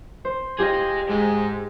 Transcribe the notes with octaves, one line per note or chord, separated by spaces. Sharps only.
C5
F4 G4 G#4 D#5
G#2 G#3